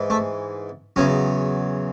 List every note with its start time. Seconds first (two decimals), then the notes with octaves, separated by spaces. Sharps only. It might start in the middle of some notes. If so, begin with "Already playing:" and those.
Already playing: G#2 E3
0.10 A3
0.96 E2 C#3 F#3 C#4